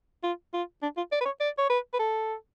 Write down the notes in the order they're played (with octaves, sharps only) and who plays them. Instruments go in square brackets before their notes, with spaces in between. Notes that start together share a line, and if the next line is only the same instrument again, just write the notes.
[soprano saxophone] F4
F4
D4
F4
D5
B4
C#5
D5
C#5
B4
B4
A4